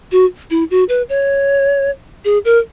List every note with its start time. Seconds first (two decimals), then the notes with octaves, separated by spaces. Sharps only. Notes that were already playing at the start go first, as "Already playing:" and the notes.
0.12 F#4
0.51 E4
0.71 F#4
0.89 B4
1.09 C#5
2.25 G#4
2.45 A#4